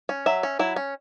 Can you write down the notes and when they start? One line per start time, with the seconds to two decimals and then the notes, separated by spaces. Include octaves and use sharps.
0.09 C#4
0.26 F#3 E5
0.43 C#4
0.59 F#3 E4
0.76 C#4